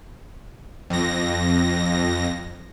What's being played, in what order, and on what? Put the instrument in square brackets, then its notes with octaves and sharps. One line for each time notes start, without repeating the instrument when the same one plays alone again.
[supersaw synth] F2 A#6